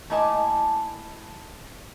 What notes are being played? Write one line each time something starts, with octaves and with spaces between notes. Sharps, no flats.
A3 A#3 E4 D#5 G#5 A5